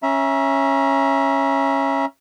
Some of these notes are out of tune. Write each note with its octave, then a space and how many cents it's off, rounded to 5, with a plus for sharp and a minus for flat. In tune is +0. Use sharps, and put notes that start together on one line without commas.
C#4 -10 E5 +0 A#5 +30